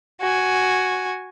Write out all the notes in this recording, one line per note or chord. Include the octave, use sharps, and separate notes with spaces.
F#4 G#5